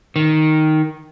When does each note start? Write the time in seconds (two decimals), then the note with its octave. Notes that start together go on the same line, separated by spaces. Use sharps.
0.16 D#3